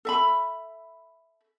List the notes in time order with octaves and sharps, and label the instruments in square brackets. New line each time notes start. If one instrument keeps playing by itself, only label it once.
[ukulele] A4 E5 B5